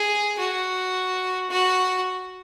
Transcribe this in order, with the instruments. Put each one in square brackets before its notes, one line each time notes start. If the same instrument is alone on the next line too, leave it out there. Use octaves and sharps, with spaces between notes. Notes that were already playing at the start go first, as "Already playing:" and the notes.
Already playing: [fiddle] G#4
F#4
F#4